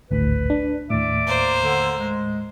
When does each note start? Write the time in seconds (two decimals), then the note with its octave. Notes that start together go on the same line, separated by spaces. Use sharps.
0.10 G#1 D2 A2 B4
0.50 D4
0.90 D#2 A2 D5 E5 D6
1.27 A#3 C5
1.63 D3
1.99 G#3